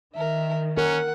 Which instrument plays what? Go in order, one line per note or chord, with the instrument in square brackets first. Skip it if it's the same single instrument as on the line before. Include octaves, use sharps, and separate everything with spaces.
[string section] D#3 [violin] A#4 E5
[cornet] C#4 [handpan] A#4 [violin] F#5